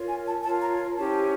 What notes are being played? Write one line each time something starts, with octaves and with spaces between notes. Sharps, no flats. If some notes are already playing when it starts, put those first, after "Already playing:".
Already playing: F4 A#4 C#5
G#5
A5
F4 A#4 C#5 A5
A#5
C#4 E4 G4 C5 A5